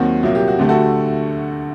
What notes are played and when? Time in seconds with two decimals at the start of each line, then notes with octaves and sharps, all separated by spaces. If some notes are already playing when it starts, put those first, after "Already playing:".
Already playing: D#2 D#3 F#3 C4 F#4
0.23 C2 A#2 F#3 A#3
0.35 G4
0.48 F#4
0.59 D2 D3 A3 G4
0.69 F#4 A4